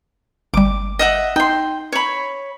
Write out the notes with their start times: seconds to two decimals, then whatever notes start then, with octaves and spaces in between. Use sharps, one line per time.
0.54 G1 G3 D6
0.99 D#5 E5 F#5
1.36 D#4 G5 C6
1.92 C#5 B5